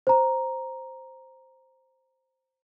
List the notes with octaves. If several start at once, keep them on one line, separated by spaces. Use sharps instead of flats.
C5 A#5